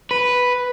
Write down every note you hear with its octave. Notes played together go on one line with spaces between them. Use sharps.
B4